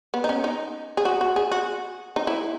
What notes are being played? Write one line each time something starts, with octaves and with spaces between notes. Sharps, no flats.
B3
D#4
C#4
D#4
G#4
F#4
F#4
G#4
F#4
D#4
E4